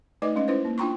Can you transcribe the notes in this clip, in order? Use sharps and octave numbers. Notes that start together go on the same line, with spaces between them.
A3 D#4 B4 D5 D#5 D6
G#3 C#4 D#5
C#4 E4 B4 C5
A#3
D4 F4 G5 A#5 C6 C#6